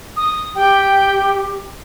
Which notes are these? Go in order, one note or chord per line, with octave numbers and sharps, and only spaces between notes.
D#6
G4 G5